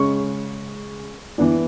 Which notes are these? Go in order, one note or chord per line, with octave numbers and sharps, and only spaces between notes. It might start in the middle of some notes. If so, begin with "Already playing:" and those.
Already playing: C#3 G#3 C#4 C#6
E3 B3 D4